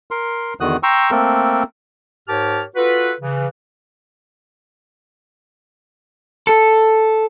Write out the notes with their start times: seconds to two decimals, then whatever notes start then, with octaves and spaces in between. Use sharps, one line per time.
0.11 A#4 C6
0.61 E2 D3 D#3 F#4 D#6 F#6
0.83 G5 A#5 C6 C#6 E6
1.11 A3 A#3 C4 A4 A#4
2.28 G#2 G4 A#4 C#5 A5 F6
2.75 F4 F#4 A4 B4
3.20 C#3 E3
6.47 A4